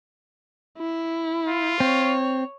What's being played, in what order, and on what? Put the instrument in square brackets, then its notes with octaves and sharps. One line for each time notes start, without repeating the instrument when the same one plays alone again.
[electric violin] E4
[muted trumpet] F4
[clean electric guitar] C4 [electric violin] C#5